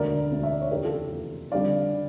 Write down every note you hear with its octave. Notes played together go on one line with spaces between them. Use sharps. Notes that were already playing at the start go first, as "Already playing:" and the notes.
Already playing: E1 D2 D3 A#4 D5
E1 D2 D3
E5
D5
C#5
F1 E2 C#3 G4 A#4
F4 A4
F1 E2 C#3
F2 D3 G3 D4 D5 F5
D3